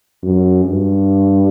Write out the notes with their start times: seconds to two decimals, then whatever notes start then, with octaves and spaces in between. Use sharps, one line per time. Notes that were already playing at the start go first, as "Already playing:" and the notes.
0.23 F#2
0.65 G2